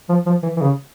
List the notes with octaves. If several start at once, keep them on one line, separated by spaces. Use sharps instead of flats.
F3
F3
E3
E3
C#3